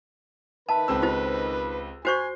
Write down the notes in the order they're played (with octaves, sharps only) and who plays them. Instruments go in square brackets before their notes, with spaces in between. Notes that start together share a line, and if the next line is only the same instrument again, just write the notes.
[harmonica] D#3 B4 [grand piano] E5 [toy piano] A5
[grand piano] C#2 C4 E6
[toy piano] F4 G4 C5
[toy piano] F#4 C5 C#6 [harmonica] G#5 [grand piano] G6 C7